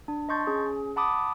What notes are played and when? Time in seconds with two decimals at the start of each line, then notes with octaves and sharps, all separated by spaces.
0.08 D4
0.29 D#5 A5 C6 C#6 G6 A6
0.47 C#4 G#4
0.96 F#5 A5 B5 D6 D#6